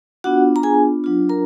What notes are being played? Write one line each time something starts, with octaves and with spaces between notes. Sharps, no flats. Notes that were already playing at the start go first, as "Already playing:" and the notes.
B3 D4 F4 F#4 F#5
A#5
G#4 G#5
F#3 D4 F4
A#4 A#5